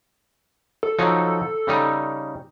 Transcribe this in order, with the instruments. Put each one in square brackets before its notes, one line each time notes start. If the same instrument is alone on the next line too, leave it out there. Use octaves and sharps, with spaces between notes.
[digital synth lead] A4
[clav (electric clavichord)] F3 F#3 D#4
C#3 G3 D#4